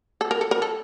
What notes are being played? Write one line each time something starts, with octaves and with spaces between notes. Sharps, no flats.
A4
A#4
A4
A#4
A4